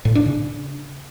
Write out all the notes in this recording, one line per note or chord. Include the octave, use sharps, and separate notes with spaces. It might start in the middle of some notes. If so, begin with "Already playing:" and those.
A2
D4
C#3